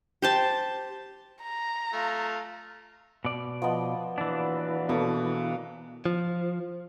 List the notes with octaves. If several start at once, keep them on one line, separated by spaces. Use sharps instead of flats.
G4 C5 A5
A#5
A3 F4
B2 D5
F3 B3 D#5
A#2 E3 F#3 D4 B4
B2 A#3 A4
F3